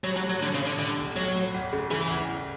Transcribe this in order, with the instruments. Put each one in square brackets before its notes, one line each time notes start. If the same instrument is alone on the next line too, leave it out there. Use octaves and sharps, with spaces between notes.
[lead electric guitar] F#3 [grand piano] G3
[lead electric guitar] F#3
[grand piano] A2
[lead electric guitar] F#3
[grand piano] A2 [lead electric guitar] D3
[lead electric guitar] C#3
[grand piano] A2
[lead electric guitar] D3
[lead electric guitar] D3 [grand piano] G3
[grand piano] B1
[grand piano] B1 [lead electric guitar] F#3
[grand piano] A2
G1
C#3
[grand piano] C#3 [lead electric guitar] E3
[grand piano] G1
G1